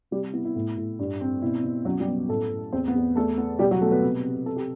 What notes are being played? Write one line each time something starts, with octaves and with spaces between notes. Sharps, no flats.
C3 G3 G4
B3 E4
E4
A2
A2
G2
C4
B2 E4
B2
F#2 F#3 F#4
G3 G4
B3
A2 A3 A4
A2
E2 C4 C5
B3 B4
E2
E2 A3 A4
B3
B2 G3 G4
F#3 F#4
B2 A3 A4
B3 B4
C3
C3
C3 A4
G4